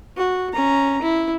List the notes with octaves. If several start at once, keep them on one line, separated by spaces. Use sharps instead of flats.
F#4
C#4 A#5
E4